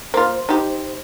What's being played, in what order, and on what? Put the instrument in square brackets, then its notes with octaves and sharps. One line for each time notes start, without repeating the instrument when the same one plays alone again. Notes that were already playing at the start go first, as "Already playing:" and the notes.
[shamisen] A#3 F4 [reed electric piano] C5
[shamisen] D#4 G4